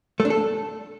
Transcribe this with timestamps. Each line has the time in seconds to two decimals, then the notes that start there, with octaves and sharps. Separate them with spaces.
0.20 A3
0.25 D4
0.30 A4